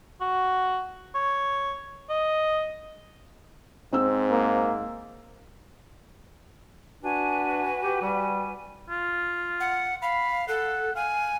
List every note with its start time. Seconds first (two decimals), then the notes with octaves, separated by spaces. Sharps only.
0.21 F#4
1.15 C#5
2.10 D#5
3.93 G#2 C4 E6
4.31 A#3
7.02 D4 F#4 B4 G#5
7.83 G4
8.02 G3
8.90 F4
9.60 F#5
10.02 F5 B5
10.48 A4 F#5
10.96 F5 G#5